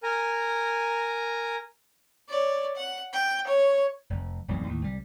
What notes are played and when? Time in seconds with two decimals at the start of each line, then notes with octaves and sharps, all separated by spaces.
0.03 A#4 G#5 A#5
2.29 C#5 D5
2.76 F#5
3.13 G5
3.47 C#5
4.10 F1
4.48 E1 B1 G2 C3
4.66 D#2 A2
4.82 C2 G3